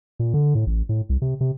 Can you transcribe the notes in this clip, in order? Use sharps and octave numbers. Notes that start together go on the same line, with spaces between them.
A#2
D3
A2
A1
A2
C2
C3
C3